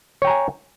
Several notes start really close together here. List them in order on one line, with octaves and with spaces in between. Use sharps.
C#5 G5 A#5 G#5